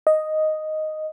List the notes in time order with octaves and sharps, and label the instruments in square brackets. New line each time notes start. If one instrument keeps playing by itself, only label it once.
[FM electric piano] D#5